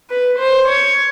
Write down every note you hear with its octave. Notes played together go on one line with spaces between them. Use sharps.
B4
C5
C#5